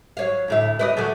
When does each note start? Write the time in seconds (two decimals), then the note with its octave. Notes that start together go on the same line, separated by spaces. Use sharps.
0.17 F#3 C#5 F5
0.48 D2 A2 E5
0.79 B4 D5 D#5
0.97 D3 F#3 A3